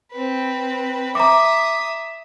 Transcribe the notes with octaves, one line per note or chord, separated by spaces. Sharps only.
C4 B4
E5 A#5 D6 D#6